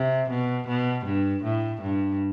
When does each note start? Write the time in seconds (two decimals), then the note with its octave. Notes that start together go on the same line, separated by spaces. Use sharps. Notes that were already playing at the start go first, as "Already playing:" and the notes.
Already playing: C3
0.30 B2
0.68 B2
1.05 G2
1.43 A2
1.82 G2